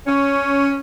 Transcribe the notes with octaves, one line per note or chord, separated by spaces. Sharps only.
C#4